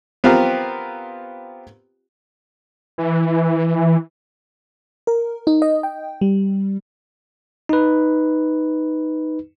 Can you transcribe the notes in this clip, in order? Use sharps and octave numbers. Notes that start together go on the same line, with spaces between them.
B3 C4 F4 G4 A#4
E3
A#4
D#4
D#5
G5
G3
D#4 B4